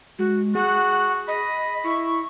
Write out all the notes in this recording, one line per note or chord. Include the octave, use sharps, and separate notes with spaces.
G#3 F#4
F#4 G#4 F#5
D#5 B5
E4 C#6